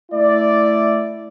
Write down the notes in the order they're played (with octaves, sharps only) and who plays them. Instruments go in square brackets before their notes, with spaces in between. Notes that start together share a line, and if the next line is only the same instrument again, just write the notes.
[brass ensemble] A3 E4 D5